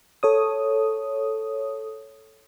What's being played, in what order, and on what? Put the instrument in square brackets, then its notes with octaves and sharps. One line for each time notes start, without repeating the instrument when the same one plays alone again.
[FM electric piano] A4 C#5 D#6